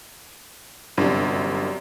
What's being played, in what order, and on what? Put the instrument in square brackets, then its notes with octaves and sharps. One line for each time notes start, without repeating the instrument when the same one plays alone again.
[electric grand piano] G1 [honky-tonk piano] F#2 C3 D4